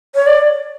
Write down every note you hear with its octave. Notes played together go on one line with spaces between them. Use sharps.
C#5
D5